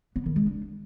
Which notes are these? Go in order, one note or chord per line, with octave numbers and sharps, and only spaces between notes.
B3
D#3
G#3
D4